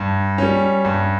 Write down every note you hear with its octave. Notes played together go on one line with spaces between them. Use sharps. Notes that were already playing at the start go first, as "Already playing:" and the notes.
Already playing: G2
G3 C#4
G2